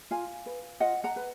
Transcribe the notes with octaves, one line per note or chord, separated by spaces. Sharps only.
F4 F5 G#5
B4
F4 D#5 F#5
F#5 A#5
B4